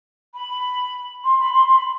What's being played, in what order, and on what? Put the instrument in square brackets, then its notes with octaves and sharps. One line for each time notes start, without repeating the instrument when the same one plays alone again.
[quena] B5
C6
B5
C6
C6
B5